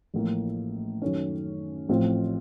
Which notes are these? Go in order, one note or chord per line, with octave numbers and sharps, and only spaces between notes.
A1 A2 F3 A#3
F#2 D#3 A3 C#4
A1 A2 F3 C4 F4